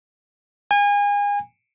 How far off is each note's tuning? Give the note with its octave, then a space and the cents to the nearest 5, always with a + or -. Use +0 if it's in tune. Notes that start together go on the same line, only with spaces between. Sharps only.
G#5 -30